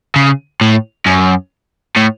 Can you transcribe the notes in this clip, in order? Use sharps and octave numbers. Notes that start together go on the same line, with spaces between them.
C#3
A2
F#2
A2